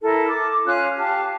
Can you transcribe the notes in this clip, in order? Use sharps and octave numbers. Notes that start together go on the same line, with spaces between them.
E4 A4 A#4
D6
C#4 F4 F5 F#6
G4 F5 A5